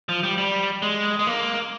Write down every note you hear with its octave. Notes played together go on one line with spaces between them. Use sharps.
F3
G3
G3
G#3
G#3
A#3